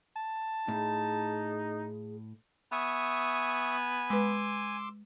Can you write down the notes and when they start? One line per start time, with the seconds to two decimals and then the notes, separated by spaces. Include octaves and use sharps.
0.16 A5
0.68 A2 D#4 G#4
2.72 B3 E5 G#5 C#6 D#6
4.10 G#3 B4 C6 D6 E6